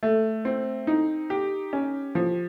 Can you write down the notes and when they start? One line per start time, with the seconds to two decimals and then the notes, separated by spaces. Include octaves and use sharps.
0.03 A3
0.45 C4
0.87 D#4
1.30 G4
1.73 C#4
2.15 F3